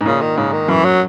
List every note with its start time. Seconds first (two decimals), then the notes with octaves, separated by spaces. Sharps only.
0.01 G#2
0.06 A#2 C#3
0.22 D#3
0.37 G#2 C#3
0.53 D#3
0.69 F#2 E3
0.85 F#3